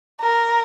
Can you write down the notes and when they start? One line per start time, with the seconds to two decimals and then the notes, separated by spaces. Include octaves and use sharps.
0.21 A#4